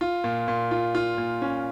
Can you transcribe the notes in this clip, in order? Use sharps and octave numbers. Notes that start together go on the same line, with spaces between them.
F4
A#2
A#2
F4
F4
A#2
C#4